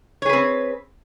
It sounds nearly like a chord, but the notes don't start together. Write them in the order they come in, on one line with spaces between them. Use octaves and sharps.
C#5 G#4 B4 C4